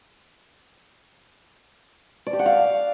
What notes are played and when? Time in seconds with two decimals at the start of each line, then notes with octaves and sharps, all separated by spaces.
2.26 D5
2.33 G4
2.39 F#5
2.46 F5